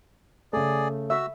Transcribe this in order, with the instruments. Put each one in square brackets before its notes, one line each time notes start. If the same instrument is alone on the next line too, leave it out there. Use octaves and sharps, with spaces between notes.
[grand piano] C#3 A3 [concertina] G#4 D5
[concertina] F#4 E6 [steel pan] E5